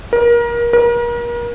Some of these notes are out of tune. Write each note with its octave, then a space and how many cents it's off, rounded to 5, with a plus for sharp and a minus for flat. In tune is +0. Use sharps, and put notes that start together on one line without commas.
A#4 +30
A#4 +40